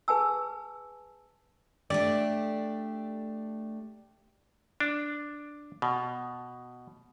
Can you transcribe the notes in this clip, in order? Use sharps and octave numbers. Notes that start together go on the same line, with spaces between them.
G#4 B4 G#5 A5 E6
A3 D4 G4 D5
D4
B2